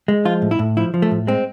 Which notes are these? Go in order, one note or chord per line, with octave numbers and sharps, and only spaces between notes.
G#3
F3 F4
A2
E4
A2
F3 E4
F3
A3
A2
G#3 C4